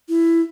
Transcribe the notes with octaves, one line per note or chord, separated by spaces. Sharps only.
E4